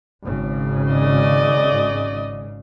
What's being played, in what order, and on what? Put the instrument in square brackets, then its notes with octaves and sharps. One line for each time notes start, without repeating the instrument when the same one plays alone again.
[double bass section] G#1 C#3
[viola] D5 D#5